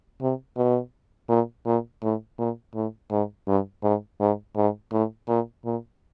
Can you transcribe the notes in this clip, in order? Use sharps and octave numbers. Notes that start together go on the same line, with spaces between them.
C3
B2
A#2
A#2
A2
A#2
A2
G#2
G2
G#2
G#2
G#2
A2
A#2
A#2